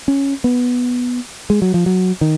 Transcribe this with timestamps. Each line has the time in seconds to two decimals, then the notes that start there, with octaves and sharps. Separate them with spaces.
0.08 C#4
0.44 B3
1.50 G#3
1.62 F#3
1.74 F3
1.86 F#3
2.21 D#3